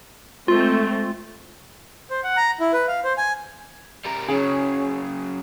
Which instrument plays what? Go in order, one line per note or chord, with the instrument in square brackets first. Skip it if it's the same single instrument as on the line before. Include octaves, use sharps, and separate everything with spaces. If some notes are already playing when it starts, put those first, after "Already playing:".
[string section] G#3 A3 C4 [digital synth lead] F4
[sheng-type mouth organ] C5
F#5
A#5
E4
B4
F5
C5
G#5
[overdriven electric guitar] G3 A#4
[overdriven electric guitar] C#3 F#3 [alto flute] C#4 [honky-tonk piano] G#4